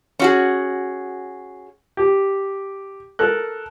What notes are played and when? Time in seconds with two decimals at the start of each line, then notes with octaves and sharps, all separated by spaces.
0.19 C#4 F#4 G#4
1.97 G4
3.19 A4 A#4 F#6